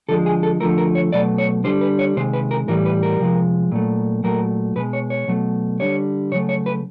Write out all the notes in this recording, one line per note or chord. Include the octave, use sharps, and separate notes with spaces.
D3 F3 G#3 A4
G#4
A4
D3 F3 A3 A#4
A#4
C#5
B2 F#3 A3 D5
C#5
D3 G3 C5
B4
C#5
C3 D#3 G#3 C5
B4
A#4
A2 E3 G3 A#4
B4
A#4
C3 F3 G#3
A#2 F#3 A3
A#2 F#3 A3 A#4
B2 G#3 B4
C#5
C#5
B2 F#3 A3
D3 G3 C#5
C#3 F#3 A3 C#5
C#5
B4